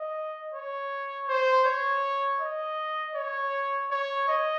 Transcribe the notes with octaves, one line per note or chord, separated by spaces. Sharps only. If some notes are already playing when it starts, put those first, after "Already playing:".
Already playing: D#5
C#5
C5
C#5
D#5
C#5
C#5
D#5